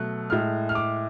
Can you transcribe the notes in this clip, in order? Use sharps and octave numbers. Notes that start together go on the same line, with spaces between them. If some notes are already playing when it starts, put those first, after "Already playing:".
Already playing: B2 F#3 A3 F#6
A2 G#3 F6
F6
D6